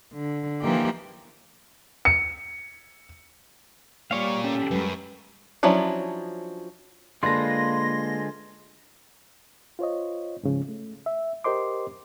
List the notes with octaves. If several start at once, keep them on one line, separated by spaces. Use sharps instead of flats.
D3
E3 F3 A#3 D#4 G4
C#7
A#2 G3 C#5 D5 F5
C#4 G4 A4
F#2 G3 G#3 B4
F3 F#3 C#4 D4 E4
D3 G#3 A#3 F4 A4 B4 C6 A#6
F4 C5 C#5 D#5
G#2 C#3 F3
A3
E5
G4 A#4 C5 D#5 C6 D6